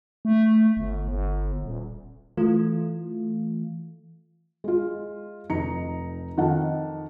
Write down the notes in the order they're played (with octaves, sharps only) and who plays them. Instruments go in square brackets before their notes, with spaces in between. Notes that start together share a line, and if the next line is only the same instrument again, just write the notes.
[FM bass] A3
G1
G1
D#1
[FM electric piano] E3 A3 F4
[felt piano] G#3 F4
F1 D#4 A#5 C#7
F2 D#3 F5 F#5 A5